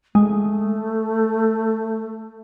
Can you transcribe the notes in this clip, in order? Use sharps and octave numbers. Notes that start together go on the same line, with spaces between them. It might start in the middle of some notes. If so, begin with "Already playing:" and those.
G#3 A3